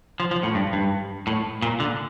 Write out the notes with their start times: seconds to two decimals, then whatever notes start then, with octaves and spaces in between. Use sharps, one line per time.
0.20 F3
0.31 F3
0.43 A2
0.55 G2
0.73 G2
1.27 A2
1.62 A#2
1.80 D3